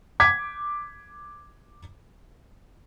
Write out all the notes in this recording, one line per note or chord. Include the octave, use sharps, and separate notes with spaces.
D6 G#6 B6